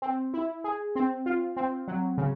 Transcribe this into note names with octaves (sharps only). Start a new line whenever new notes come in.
C4
E4
G#4
C4
F4
C4
F#3
C#3